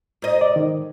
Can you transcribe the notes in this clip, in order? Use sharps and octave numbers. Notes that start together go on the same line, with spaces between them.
G#2 D#5
D5
D#3